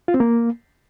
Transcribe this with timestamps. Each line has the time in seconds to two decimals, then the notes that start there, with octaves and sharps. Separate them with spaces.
0.08 F4
0.14 C4
0.20 A#3